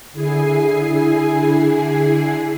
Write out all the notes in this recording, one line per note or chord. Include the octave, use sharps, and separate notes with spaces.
D3 E4 G#4 G#5 C7